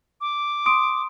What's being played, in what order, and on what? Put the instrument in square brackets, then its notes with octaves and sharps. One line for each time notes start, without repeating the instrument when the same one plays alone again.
[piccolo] D6
[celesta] C6 D#6 D7